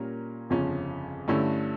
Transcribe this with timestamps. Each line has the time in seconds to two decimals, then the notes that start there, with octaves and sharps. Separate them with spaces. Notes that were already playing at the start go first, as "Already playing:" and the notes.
Already playing: A#2 G3 C#4 A#4
0.50 G1 F2 C#3 F3 C#4
1.28 G2 D3 A3 C#4 E4